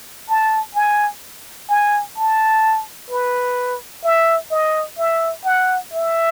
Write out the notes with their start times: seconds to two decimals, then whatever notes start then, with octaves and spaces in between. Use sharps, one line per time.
0.28 A5
0.75 G#5
1.69 G#5
2.17 A5
3.11 B4
4.04 E5
4.51 D#5
4.98 E5
5.45 F#5
5.92 E5